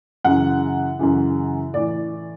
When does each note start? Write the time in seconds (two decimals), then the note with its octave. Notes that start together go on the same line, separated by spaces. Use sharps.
0.25 F#2 C#3 E3 F#5
0.99 F#2 C#3 E3
1.73 A2 E3 D5